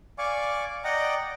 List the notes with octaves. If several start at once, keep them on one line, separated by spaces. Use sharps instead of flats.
D5 F5 G#5 C#6 D6
D5 D#5 F#5 G5 A#5 D6